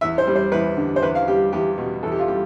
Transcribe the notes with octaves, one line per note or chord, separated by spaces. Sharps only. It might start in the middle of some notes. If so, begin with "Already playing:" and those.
E2 E5
C5
G3
C5
E2 B4
D3
C5
E2 B4
F5
G3 G4
E2 G4
B2
E2 A4
G4
F4
G3 G4